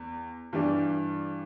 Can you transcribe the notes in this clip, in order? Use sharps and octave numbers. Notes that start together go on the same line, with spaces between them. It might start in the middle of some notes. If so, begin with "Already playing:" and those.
Already playing: E2
G2 E3 G3 D4